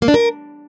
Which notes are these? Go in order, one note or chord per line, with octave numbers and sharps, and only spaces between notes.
A#3
D4
A#4